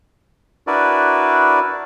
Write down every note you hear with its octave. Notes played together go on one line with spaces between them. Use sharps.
D4 E4 F#4 A#4 B4 D5